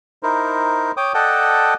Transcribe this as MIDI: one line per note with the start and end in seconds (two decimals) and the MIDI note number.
0.23 0.92 63
0.23 0.92 64
0.23 0.92 70
0.23 0.92 72
0.97 1.13 73
0.97 1.13 79
0.97 1.13 86
0.97 1.13 87
1.14 1.74 69
1.14 1.74 74
1.14 1.74 75
1.14 1.74 78
1.14 1.74 79
1.14 1.74 81